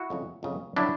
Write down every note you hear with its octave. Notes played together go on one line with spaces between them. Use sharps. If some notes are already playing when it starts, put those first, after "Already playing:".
Already playing: E4 F#4
F2 C#3 F#3
F2 C#3 F#3
C#3 F#3 D4 E4